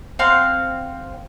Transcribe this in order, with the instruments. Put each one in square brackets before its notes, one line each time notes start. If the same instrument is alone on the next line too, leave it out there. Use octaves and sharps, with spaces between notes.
[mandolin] C4 F5 F#5 C6